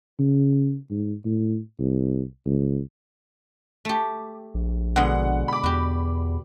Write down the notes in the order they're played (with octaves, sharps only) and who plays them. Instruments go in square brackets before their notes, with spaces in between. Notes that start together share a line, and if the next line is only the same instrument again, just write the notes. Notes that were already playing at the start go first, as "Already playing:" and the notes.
[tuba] C#3
G#2
A2
C2
C#2
[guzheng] A3 G4
[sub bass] A#1
[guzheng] B2 D3 G#3 [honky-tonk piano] F#5
[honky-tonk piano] B5 D6
[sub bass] E2 [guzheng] F#4 G4